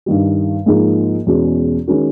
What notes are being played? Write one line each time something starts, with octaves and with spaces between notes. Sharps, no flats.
G2 D#3 G3
G#2 F3 A#3 D#4 G#4
E2 B2 G#3 C#4 F#4
D#3 G#3 C#4 F#4 A#4